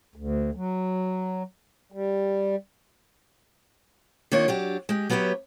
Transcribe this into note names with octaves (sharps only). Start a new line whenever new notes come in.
D2
F#3
G3
D#3 A#3 D4 F4 C#5
F#3 D4 G4
G#3 G4
F#3 B3 F#4 G4 C#5 E5